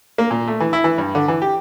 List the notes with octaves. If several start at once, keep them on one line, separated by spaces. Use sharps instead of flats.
A#3
A#2
A3
E3
E4
E3
G2
D3
E3
G4